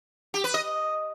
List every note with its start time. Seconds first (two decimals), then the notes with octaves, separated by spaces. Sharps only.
0.34 G4
0.44 B4
0.54 D#5